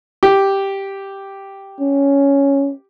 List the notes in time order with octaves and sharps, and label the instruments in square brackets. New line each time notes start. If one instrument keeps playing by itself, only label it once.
[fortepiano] G4
[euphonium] C#4